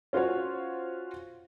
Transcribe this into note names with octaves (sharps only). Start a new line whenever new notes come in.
C#4 F4 F#4 C5 C#5